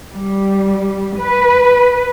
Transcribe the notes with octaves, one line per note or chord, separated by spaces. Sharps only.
G3
B4